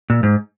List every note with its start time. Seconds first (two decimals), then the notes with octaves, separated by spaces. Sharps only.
0.10 A#2
0.23 G#2